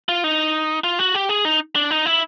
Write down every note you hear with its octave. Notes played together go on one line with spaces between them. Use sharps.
F4
D#4
F4
F#4
G4
G#4
D#4
D4
D#4
E4